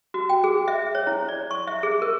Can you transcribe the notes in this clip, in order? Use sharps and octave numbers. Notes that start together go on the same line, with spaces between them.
F#4
G5
G#4
E5
C#5
E4
D5
C#6
E5
G#4
A#4